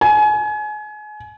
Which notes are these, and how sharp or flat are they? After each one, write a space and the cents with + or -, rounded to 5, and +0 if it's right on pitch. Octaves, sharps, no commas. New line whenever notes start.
G#5 +30